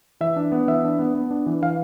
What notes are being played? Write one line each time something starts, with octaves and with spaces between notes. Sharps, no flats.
E3 E5
D4
B3
E3 E5
D4
B3
B3
D4
E3
E3 F5